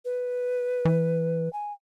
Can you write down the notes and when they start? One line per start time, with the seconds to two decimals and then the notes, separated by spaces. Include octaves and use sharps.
0.05 B4
0.85 E3
1.53 G#5